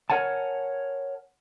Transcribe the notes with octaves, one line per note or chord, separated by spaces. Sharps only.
A#4 C#5 F#5 G#5 A5